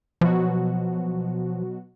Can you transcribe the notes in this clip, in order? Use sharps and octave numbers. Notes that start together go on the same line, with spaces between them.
B2 F3 F#3 F#4